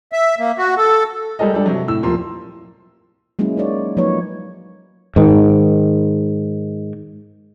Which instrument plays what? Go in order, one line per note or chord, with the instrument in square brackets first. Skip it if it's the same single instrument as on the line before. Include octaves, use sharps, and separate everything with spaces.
[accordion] E5
A#3
F#4
A4
[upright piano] G3 G#3 A4 A#4 D#5
G3 D4 A4
C3 F#3
A2 E6
D#1 F3 A#4 C6
[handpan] F#3 G#3 A#3 C#4 E4
D#4 A#4 C#5 D5
F3 F#3 A#3 D#4 B4 C#5
[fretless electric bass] G#2 D#3